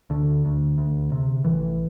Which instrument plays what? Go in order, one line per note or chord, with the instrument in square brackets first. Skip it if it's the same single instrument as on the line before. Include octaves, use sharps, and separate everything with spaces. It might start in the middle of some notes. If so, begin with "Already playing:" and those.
[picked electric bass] D2 D3
D2
D2
C3
A1 E3